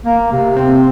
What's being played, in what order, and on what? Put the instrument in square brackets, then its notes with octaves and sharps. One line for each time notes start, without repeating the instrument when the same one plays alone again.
[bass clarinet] A#3
C3
[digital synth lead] C4